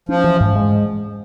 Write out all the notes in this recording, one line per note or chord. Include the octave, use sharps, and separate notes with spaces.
F3 C#4
E3
G#2
G#3